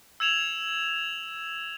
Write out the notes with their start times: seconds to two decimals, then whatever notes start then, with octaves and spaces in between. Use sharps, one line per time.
0.20 E6 G#6 E7 F7